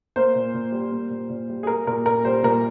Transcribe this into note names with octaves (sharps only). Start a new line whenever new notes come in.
A#3 C5
A#2
A#2
G3
A#3
A#2
A#2
G3
G#4
A#3 A#4
A#2 A#4
A#2 A#4
G3 C5
A#2 A#4